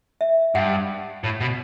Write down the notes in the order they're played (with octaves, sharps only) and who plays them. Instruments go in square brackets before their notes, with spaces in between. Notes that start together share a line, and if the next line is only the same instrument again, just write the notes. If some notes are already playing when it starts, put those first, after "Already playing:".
[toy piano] E5
[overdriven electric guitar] G2 [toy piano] F#5
[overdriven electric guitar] A2
B2